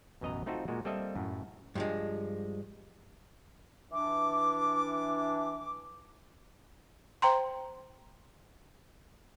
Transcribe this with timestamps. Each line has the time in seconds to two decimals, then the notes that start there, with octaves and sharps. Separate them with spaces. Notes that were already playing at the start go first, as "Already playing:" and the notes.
0.21 A1 F#2 B2 D#5 F#5 A#5
0.46 A3 C4 D#4 F4 F#4 A4
0.68 A#2 G#3 F#4
0.85 G3 A#3 C4 A4 D#5 E5
1.15 F#2 A2
1.75 G2 F3 G#3
3.92 E3 D4 D6
7.22 C5 G5 A#5 C6